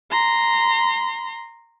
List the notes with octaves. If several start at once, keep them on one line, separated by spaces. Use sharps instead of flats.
A#5 C6